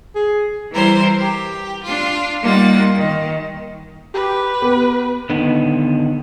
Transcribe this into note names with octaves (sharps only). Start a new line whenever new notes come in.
G#4
E3 G3 E4 A#4 C5
G4
D4 F4
G3 A#3 D#4 F4 F#5 A6
D#3
G4 B4
B3
D3 D#3 B3 D#4